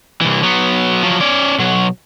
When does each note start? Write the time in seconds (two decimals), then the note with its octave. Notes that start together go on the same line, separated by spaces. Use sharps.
0.21 C2 E3
0.43 F#3 B3
1.03 F3 F#3
1.21 C#4 D5
1.59 B1 F#3